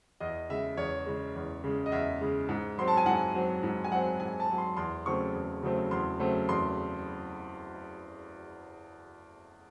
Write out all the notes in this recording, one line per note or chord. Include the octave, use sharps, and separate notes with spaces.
E2 D#5
C#3 G#3 E5
E2 C#5
C#3 G#3
E2
C#3 G#3
D#5
E2 E5
C#3 G#3
G#2
F#3 C4 C6
A5
G#5
G#2 F#5
F#3 C4
G#2
G#5
F#3 C4 F#5
G#2 G#5
A5
F#3 C4
C6
E2 C6
C#3 F#3 A3 C4 C#6
E2
C#3 F#3 A3 C4
E2 C6
C#3 F#3 A3 C4
E2 C6